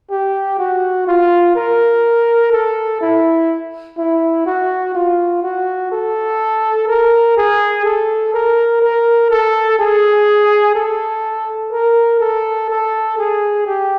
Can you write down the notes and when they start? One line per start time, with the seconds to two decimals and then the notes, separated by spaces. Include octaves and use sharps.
0.11 G4
0.59 F#4
1.07 F4
1.56 A#4
2.52 A4
3.01 E4
3.98 E4
4.46 F#4
4.95 F4
5.43 F#4
5.92 A4
6.88 A#4
7.37 G#4
7.84 A4
8.34 A#4
8.82 A#4
9.31 A4
9.79 G#4
10.75 A4
11.72 A#4
12.21 A4
12.70 A4
13.18 G#4
13.66 G4